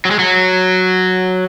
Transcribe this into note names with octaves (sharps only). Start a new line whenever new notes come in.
F#3
G#3
F#3